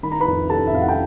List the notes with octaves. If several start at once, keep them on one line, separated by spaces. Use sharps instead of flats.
D#3 B5
A#5
B4 B5
F2
C3 A4 A5
E5
F2 F5
F#5
G5